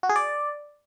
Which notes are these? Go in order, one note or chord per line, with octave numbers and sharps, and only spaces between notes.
F#4
G#4
D5